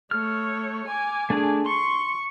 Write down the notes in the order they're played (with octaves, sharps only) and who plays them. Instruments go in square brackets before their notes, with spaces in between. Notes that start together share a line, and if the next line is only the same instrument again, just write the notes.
[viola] A3 C#5 [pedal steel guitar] F6
[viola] G#5 D6
[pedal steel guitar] A3 D4 G#4
[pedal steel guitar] C6 [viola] C#6